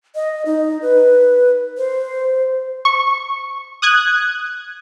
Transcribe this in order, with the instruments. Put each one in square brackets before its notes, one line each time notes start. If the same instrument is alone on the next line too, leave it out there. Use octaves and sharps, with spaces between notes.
[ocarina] D#5
D#4
B4
C5
[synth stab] C#6
D#6 F#6 G#6